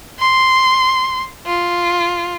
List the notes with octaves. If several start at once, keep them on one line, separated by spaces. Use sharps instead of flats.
C6
F4